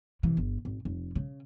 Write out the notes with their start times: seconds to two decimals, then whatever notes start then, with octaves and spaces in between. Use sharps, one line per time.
0.23 C3 E3
0.37 G1
0.65 G#1
0.85 F1
1.15 C#3